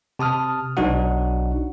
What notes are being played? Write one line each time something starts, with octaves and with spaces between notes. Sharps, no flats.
C3 A5 D#6 F6
B1 F#3 D4 D#4 F#4 F#5